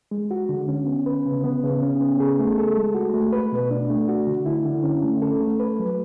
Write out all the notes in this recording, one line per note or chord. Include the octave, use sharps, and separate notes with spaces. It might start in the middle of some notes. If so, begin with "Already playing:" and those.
G#3
F#4
D3
C#4
B3
B4
C#3
B3
C#3
C#4
B3
G#4
A3
A4
G#3
F#4
A3
B4
B2
D4
A3
F#4
D3
E4
D3
C#4
A3
A4
A3
B4
F#3